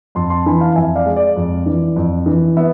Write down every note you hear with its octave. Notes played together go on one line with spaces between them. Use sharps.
F2 A5 C6
A5 C6
E3 G#5 B5
F5 A5
F2 E5 G#5
D5 F5
G#3
D5
F2
E3
F2
E3
B3 E5